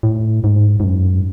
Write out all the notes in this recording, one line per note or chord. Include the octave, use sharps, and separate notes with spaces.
A2
G#2
G#2
F#2